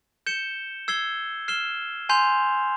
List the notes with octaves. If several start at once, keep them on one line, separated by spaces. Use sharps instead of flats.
G6 C#7 E7 G7
E6 G#6 C7 G7
F6 C7 E7 G7
G#5 C6 G6 C7 F7